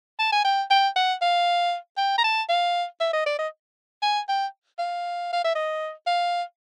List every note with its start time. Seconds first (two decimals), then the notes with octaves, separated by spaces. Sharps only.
0.19 A5
0.32 G#5
0.44 G5
0.70 G5
0.96 F#5
1.22 F5
1.97 G5
2.18 A#5
2.24 A5
2.49 F5
3.00 E5
3.13 D#5
3.26 D5
3.39 D#5
4.02 G#5
4.28 G5
4.79 F5
5.33 F5
5.44 E5
5.55 D#5
6.07 F5